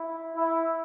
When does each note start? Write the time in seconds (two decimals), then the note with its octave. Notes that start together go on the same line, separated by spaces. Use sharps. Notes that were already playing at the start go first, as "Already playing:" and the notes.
Already playing: E4
0.35 E4